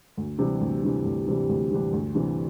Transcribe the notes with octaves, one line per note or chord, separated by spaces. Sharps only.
D2
C3 E3 G3 D4
D2
C3 E3 G3 D4
D2
C3 E3 G3 D4
D2
C3 E3 G3 D4
D2
C3 E3 G3 D4